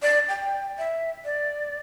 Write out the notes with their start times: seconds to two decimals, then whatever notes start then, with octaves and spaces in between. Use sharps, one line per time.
0.02 D5
0.29 G5
0.78 E5
1.25 D5